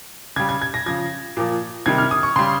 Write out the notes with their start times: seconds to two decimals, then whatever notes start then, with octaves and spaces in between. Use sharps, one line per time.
0.36 C#3 G3 G#6
0.49 G#6
0.62 G#6
0.74 A#6
0.86 C#3 F3 G#6
1.37 A#2 F3
1.86 C3 D#3 G3 G#6
1.98 F6
2.11 D#6
2.23 C#6
2.36 C#3 G3 C6